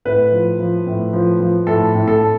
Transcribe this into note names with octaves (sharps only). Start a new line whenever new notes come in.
A2 B4
F3
F3
A2
F3
F3
A2 A4
A2
A4
A2